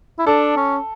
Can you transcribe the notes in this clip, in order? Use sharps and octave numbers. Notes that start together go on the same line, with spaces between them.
E4
D4 A4
C#4